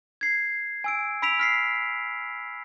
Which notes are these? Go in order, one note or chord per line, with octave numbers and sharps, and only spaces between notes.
G#6 C7
G#5 E6 D7
B5 E6 B6 D7 F7
F6 B6 C7